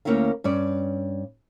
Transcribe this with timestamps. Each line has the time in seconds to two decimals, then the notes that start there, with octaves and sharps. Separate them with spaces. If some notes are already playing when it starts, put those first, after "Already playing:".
0.05 D2 A#3 C#4 E4 A#4 F5
0.44 G2 C#4 D5